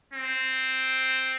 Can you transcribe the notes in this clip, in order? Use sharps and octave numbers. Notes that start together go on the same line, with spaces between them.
C4